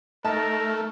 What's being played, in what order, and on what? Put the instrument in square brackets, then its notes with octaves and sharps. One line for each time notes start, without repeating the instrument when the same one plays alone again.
[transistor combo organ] A3 [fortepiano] D#4 E5 A5 [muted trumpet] A#4